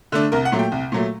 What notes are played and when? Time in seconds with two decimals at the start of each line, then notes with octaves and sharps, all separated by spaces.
0.12 D3 A3 D4
0.32 C2 A#4
0.45 F#5
0.52 A#2 F#3 A3
0.59 G5
0.72 C2
0.92 A#2 F#3 A3